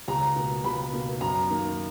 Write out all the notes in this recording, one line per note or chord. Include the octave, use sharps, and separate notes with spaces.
C#2 A#5
B2 A#3
C#2 B5
B2 A#3
F#2 A#5
D#3 A#3